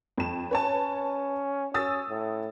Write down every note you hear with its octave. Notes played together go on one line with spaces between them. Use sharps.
F2 E7
C#4 B4 C#5 A5
C#4 D#6 E6 A6
A2